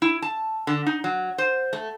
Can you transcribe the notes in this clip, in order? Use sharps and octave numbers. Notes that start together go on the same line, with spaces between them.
E4
A5
D3
D#4
F#3
C5
A3